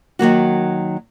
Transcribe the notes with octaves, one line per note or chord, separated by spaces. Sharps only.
D#3 F#3 A#3 F#4